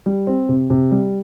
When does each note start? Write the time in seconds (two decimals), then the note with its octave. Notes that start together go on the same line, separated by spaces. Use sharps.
0.06 G3
0.27 C4
0.49 C3
0.70 C3
0.91 G3